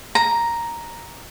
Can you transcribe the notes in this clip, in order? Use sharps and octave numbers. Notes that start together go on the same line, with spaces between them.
A#5